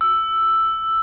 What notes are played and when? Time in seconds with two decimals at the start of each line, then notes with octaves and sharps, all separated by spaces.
0.01 E6